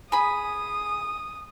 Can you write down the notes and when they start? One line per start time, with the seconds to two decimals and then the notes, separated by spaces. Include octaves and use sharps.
0.12 G#4 B5 D#6